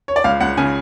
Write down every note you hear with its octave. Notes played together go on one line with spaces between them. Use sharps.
C#5
D5
C#2 F5
C#2 F#5
C#3 G#5